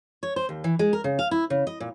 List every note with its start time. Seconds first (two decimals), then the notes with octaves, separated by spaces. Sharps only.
0.23 C#5
0.36 C5
0.49 D#2
0.64 E3
0.79 G#3
0.93 A#4
1.04 C#3
1.19 F5
1.31 E4
1.50 C#3
1.67 D#5
1.80 A#2